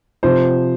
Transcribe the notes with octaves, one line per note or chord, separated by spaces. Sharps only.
C3 F3 C5